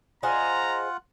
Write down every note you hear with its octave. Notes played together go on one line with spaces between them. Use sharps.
F4 G#4 C5 D#5 F#5 A#5